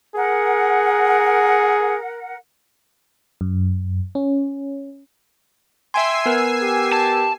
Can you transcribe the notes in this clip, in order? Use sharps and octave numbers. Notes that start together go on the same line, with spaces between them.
G#4 A#4 F#5
F#2
C#4
E5 G5 G#5 C6 E6 C7
B3 A#4 B4
G4
A5